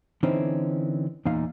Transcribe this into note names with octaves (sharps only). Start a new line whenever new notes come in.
D3 E3 C4 C#4 D#4
E2 A#2 D#4 F5